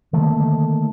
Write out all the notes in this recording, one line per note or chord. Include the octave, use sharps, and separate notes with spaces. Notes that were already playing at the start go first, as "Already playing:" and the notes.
D3 D#3 A3 A#3